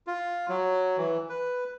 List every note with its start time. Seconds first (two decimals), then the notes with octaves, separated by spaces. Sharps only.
0.07 F4
0.49 F#3
0.97 E3
1.29 B4